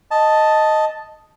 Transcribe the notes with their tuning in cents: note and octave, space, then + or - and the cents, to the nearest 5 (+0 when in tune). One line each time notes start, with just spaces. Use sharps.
D#5 +0 A5 +0